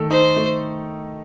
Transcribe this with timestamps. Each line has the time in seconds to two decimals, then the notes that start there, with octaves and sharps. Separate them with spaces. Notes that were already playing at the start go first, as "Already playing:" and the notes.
Already playing: D#3 A3 A4
0.11 D#4 C5
0.36 A3